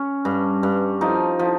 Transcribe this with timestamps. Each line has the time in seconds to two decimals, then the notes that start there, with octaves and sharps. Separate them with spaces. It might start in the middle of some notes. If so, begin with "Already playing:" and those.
Already playing: C#4
0.25 G2
0.63 G2
1.01 F3 D#4
1.39 F3